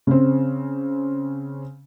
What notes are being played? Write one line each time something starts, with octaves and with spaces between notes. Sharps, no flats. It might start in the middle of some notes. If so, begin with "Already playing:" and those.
C#3 C4